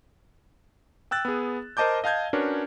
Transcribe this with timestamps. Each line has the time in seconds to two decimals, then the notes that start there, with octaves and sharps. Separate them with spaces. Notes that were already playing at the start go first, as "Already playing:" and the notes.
1.11 G5 E6 F#6 A6
1.25 B3 G#4
1.77 A#4 C5 D#5 A5 D6 G6
2.04 D#5 F5 A5 G6 G#6
2.33 C#4 D4 F#4 A#4 B4 C#5